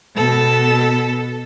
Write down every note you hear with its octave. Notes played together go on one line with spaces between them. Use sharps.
B2 A4